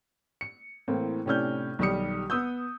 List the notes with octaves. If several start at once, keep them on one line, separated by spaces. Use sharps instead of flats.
C#7
A2 E3 A#3 C4
A2 C3 C#4 D4 F6 G6
B1 D#3 G3 G4 D#6 C#7
B3 D#6 E6 G6